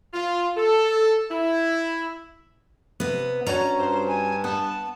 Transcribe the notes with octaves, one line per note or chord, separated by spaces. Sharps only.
F4
A4
E4
C3 B3
C#4 D4 F#4 A#5
G2 C5
G#5
B3 A5